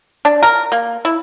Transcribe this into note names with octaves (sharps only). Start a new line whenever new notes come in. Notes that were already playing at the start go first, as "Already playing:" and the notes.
D4
A#4
A#3
E4